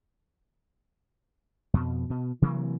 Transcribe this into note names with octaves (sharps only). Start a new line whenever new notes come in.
F2 B2
B2
C3 E3 F#3 A#3